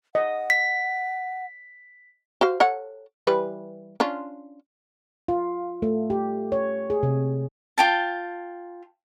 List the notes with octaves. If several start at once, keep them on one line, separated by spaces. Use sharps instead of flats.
D#5 F#5
B6
F#4 C5 F5
A4 C#5 F#5
E3 G3 B4
C#4 D4 F4
F4
A3
G4
C#5
G#4
C3
F4 G5 A5